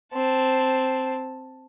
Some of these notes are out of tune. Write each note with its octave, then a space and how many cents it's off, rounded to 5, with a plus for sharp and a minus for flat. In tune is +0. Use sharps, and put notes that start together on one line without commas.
C4 +0 A5 +0